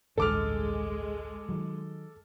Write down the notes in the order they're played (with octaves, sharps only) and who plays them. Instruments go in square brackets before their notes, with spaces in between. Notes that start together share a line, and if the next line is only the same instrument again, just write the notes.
[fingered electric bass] A1 D2 G2 [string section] G#3 [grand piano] A4 D6 F6
[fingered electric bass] D#3 F#3